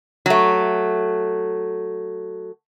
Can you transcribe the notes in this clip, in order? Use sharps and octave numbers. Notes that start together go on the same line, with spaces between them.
F#3 A3